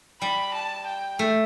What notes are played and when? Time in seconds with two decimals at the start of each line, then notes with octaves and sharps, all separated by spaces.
0.21 G3 B5
0.54 A5
0.87 G5
1.19 A3